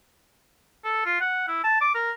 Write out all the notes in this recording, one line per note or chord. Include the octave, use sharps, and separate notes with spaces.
A4
F4
F#5
E4
A5
D6
A#4